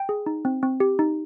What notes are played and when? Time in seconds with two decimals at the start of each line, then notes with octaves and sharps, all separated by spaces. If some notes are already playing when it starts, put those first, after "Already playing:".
Already playing: G5
0.09 G#4
0.26 D#4
0.45 C4
0.63 C4
0.80 G4
0.99 D#4